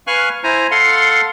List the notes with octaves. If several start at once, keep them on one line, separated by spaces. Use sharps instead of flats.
B4 F5 G#5 C#6 F6 F#6
E4 C5 G#5 A#5
A4 F5 F#5 C6